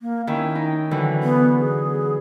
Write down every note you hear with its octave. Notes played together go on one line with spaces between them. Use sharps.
A#3
D#3 C#4 E4 G5
D#4
D3 E3 F#3
B3
G#4